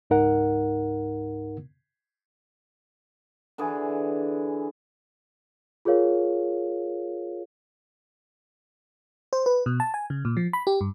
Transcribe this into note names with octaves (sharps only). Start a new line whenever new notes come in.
C#2 G#2 D#4 A#4 F#5
D3 E3 G#4
F4 G#4 A#4 C#5 F5
C5
B4
B2
A5
G#5
C#3
A#2
F3
B5
G4
G2